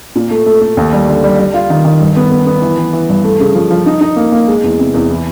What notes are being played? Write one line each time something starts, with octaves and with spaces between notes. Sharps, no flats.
A#2
A3
A3
A3
D#2
G3
D3
G3
G3
F4
D#3
D#3
G2
B3
B3
B3
E3
E3
E3
G2
A3
C#3
F3
F3
D#4
D#4
A#3
A#3
G#3
E2
C3
E2
E3